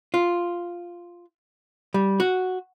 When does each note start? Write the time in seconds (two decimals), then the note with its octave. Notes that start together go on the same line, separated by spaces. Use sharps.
0.14 F4
1.94 G3
2.20 F#4